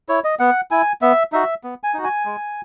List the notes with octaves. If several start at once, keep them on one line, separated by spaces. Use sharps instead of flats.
E4 C#5
D#5
B3 F#5
E4 G#5
B3 E5
D#4 F#4 E5
B3
G#5
D#4 F#4
G#5
G#3